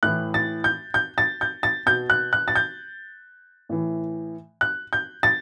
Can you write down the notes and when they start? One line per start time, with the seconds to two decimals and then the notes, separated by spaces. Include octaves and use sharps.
0.03 A2 E3 F#6
0.34 A6
0.64 G6
0.94 G6
1.18 A6
1.41 G6
1.63 A6
1.86 B2 G6
2.10 F#6
2.33 F#6
2.48 A6
2.56 G6
3.69 A2 E3
4.61 F#6
4.93 G6
5.23 A6